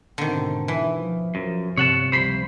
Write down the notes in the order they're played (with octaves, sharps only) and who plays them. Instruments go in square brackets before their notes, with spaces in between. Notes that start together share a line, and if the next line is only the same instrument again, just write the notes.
[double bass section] G#2 B2 C4 [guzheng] D3 D#3
[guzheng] E3
[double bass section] F3
[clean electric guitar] F#2 [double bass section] F3
[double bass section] G1 [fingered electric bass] C3 [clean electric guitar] C#5 F#5 A5
[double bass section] C#2 F3 G3 [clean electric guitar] C5 B5 C6